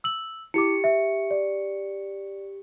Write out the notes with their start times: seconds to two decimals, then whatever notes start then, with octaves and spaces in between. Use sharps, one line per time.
0.04 E6 F#7
0.54 E4 G4 D6 C#7
0.84 E5
1.31 D5